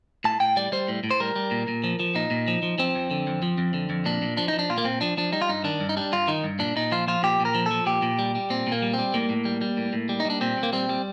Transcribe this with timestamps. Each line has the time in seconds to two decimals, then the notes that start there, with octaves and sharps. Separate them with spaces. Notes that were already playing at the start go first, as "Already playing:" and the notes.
0.24 A2 A5
0.40 A2 G5
0.56 G3 D5
0.72 G3 C5
0.88 A2
1.04 A2
1.11 C5
1.20 G3 A#4
1.36 G3
1.51 A#2
1.68 A#2
1.84 F3
2.00 F3
2.15 A#2 D#4
2.31 A#2
2.48 F3
2.63 F3
2.78 F3 C4
2.95 F2
3.11 D3
3.27 F2
3.43 F3
3.58 F2
3.74 D3
3.90 F2
4.06 A#2 D4
4.22 A#2
4.37 F3 D4
4.48 F3 D#4
4.59 D4
4.70 A#2 F4
4.78 A#3
4.85 A#2 C4
5.01 F3 D4
5.17 F3 D4
5.32 G3 D#4
5.42 F4
5.49 G2 D#4
5.64 D#3 D4
5.80 G2
5.89 D#4
5.97 G3 D4
6.12 G2 F4
6.28 D#3 D#4
6.44 G2
6.59 A#2 D4
6.76 A#2 D#4
6.92 F3 F4
7.08 F3 F4
7.23 A#2 G4
7.40 A#2
7.45 A#4
7.55 F3
7.66 F3 A4
7.86 A#2 G4
8.02 A#2
8.19 G3
8.35 G3
8.50 A#2 C4
8.67 A#2 A#3
8.82 G3
8.94 C4
8.99 G3
9.14 A2 A#3
9.29 A2
9.45 G3
9.61 G3
9.77 A2
9.93 A2
10.09 G3
10.20 D#4
10.25 G3 D4
10.41 A#2 C4
10.58 A#2
10.63 A#3
10.73 G3 C4
10.89 G3